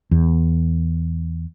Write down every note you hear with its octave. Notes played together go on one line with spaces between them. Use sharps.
E2